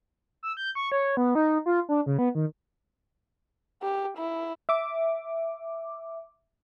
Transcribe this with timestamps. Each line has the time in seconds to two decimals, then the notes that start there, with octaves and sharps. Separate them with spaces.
0.43 E6
0.57 G6
0.75 C#6
0.92 C#5
1.17 B3
1.35 D#4
1.66 F4
1.89 D4
2.06 C#3
2.19 B3
2.35 D#3
3.82 G4
4.18 E4
4.69 E5 D6